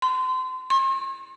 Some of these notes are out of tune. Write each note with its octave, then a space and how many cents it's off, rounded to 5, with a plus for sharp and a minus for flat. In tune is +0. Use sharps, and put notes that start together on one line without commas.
C6 -30
C6 +45